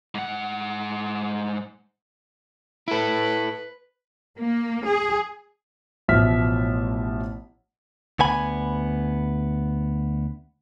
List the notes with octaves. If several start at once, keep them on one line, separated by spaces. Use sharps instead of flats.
G#2 F#5
E4 A4 B4
A#3
G#4
A1 B2 F3 E5 F6 B6
D2 B3 G#5 B5